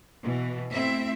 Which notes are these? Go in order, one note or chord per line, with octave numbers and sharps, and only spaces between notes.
B2 E3
A3 C4 E4 E5